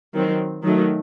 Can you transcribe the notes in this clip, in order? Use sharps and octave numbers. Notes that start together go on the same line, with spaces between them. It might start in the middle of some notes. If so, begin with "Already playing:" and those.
D#3 F#3 C4
D#3 F#3 A3